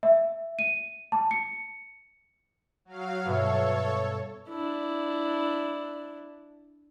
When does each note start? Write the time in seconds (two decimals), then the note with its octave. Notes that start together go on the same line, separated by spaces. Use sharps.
0.03 E5
0.59 D#7
1.12 A5
1.31 C#7
2.85 F#3 F5
3.25 G2 B2 A4 C#5 E5
4.48 D4 E4